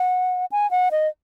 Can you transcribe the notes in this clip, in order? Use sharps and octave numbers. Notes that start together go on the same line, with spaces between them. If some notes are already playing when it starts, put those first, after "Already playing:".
Already playing: F#5
G#5
F#5
D#5